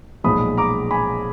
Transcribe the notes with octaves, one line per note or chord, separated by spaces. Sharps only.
B1 A#2 F3 G#3 B5 D#6
A#5 D6
G#5 B5